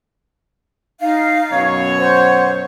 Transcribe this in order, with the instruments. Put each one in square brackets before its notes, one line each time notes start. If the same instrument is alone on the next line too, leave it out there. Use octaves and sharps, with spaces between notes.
[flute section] D#4 F5
[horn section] F#2 B2 C#5
[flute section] C5 F#5